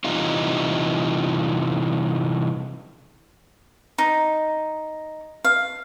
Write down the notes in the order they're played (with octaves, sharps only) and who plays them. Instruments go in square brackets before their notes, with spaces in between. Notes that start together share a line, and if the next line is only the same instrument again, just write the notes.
[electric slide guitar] C3 E3 G3 D#4 F4
[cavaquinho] D#4
F5